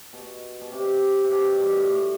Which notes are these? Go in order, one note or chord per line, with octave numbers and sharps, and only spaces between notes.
B2
B2
C3
C3
B2
G2
A2
A2